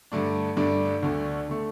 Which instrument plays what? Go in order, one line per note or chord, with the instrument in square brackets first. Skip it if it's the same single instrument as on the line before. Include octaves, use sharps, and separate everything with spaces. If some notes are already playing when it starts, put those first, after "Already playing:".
[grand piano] G2 D3 A3 D4
G2 D3 A3 D4
D2 D3 A3
D3 A3